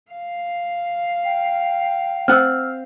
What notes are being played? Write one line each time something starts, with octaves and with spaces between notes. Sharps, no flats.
F5
G5
C4 F#5 E6 F6